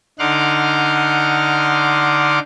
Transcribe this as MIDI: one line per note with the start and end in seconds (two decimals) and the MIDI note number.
0.19 2.39 50
0.19 2.39 63
0.19 2.39 78
0.19 2.39 84
0.19 2.39 86
0.19 2.39 89